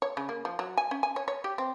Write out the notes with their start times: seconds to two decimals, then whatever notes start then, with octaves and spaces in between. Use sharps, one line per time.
0.02 C#5
0.17 C#3
0.29 A#3
0.45 F3
0.59 F#3
0.77 G#5
0.91 C#4
1.03 G#5
1.16 C#5
1.28 C#5
1.44 G4
1.58 C4